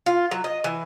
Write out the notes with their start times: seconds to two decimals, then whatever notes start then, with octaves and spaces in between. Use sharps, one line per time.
0.06 F4
0.31 F#3
0.44 D#5
0.64 E3